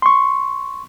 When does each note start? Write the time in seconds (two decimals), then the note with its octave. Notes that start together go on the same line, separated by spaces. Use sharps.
0.02 C6 C#6